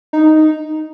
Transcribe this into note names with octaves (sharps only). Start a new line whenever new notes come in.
D#4